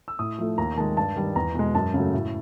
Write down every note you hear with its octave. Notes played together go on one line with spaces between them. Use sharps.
E6
A2 D#6
F3 A3
D#2 A#5
D#3 G#3 A5
G2 A5
D#3 G3
E2 A#5
B2 G#3
F#2 A5
C#3 F#3 A3
A2